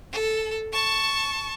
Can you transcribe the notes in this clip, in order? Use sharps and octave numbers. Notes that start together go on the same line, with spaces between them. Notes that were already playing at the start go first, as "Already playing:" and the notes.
A4
A5 C#6